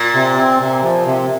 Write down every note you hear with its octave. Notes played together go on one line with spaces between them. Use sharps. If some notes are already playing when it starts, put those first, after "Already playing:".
Already playing: A#2
C3
C4
C3
F3
C3